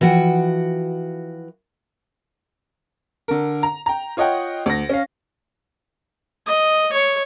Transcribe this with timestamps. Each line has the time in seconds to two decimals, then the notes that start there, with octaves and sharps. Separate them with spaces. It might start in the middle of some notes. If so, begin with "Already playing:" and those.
0.01 E3 F3 F#4 D5 F#5 G5
3.28 D3 A#4
3.63 A#5
3.86 G5 A#5
4.17 F4 C#5 D#5 F#5 G5
4.66 D2 A#6
4.89 C#4 F5
6.47 D#5
6.93 C#5